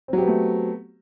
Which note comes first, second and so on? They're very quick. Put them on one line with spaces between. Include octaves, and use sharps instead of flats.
C4 F#3 G4 B3 A3